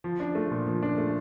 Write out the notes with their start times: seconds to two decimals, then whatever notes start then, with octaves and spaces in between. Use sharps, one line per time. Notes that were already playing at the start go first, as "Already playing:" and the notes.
0.04 F3
0.20 D4
0.35 A3
0.51 A#2
0.67 F3
0.83 D4
0.98 A3